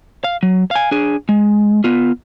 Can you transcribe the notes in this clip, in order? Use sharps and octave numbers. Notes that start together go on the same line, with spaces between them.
F5
F#3
F5 G#5
D4 G#4
G#3
B3 F4